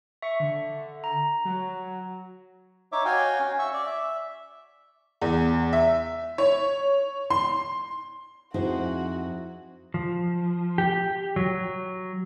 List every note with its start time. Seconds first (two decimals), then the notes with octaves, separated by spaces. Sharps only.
0.22 E5 C#6
0.40 D3
1.04 A#5
1.45 F#3
2.92 D#4 C#5 E5 D6
3.05 F#4 C#5 F5 G5 G#5
3.40 C#4
3.59 E5 C#6 E6
3.73 D5
3.86 E5
5.22 E2
5.73 E5
6.38 C#5
7.30 C6
8.54 F2 D#4 E4 F#4 G#4 C5
9.94 F3
10.78 G4
11.36 F#3